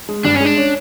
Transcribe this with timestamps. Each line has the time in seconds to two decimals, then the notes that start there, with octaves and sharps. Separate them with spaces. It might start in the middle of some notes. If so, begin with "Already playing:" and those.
0.09 G#3
0.25 G2 D4
0.35 C#4
0.40 G#3 D4
0.57 C#4